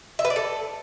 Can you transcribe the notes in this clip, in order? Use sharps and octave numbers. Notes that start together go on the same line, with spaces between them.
E5
B4
D5
A4